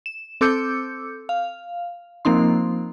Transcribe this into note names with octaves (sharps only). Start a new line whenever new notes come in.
E7
C4 A4 D6 E6 G6 C#7
F5
F3 A#3 C4 D#4 C6